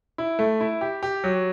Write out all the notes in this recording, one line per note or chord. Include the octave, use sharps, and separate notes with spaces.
E4
A3
E4
G4
G4
F#3